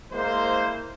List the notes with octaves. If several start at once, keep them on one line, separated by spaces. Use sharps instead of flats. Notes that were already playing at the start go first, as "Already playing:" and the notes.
G#3 A#3 E4 C5